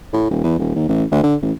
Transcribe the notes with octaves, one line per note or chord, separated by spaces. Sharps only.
A2
D#1
E2
D#1
D#2
A1
D2
D3
A1